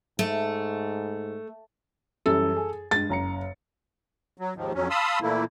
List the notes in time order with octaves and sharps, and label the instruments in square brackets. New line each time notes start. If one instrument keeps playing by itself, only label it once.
[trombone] G#2 [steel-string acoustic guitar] A3
[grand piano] F#2 E3 G3 [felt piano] A4
[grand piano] G#4
[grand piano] G2 G#3 [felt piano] A6
[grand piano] F#1 A#5 C#7
[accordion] F#3
D#2 G#2 D#3 F3
F2 F#3 C#4
F5 A5 B5 C6 D#6 E6
A#2 E3 A3 A#3 E4